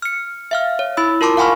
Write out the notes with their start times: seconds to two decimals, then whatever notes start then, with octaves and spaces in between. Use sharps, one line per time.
0.02 F6 C#7
0.51 E5 F5 F6
0.79 C#5
0.97 E4 B5 E6
1.21 F4 A#4 A5 C6 D6
1.37 F5 F#5 G#5 B5 C#6 F6